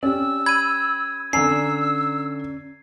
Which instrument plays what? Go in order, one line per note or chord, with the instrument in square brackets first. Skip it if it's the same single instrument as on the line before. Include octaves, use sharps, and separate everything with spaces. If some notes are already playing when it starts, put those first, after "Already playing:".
[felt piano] C#4 G4 [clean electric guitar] D5 [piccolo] E6
[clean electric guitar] B5 [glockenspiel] G#6 D#7
[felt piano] D3 G#5 [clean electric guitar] C#4 D5 A#5 [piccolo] E6 [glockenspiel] C7